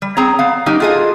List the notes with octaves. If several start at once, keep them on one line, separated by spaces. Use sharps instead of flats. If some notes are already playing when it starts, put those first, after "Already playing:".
G3
C4 G#4 C#5 A#5
B3 F5
F#3 A#3 D#4 G4
F4 F#4 G#4 A4 D#5